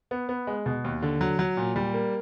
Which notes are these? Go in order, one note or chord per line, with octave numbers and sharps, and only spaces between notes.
B3
B3
G#3
B2
D#2
D3
F#3
F#3
A#2
G3
A#3